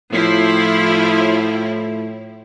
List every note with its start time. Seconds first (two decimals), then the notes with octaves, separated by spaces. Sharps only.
0.12 A2 F3 E4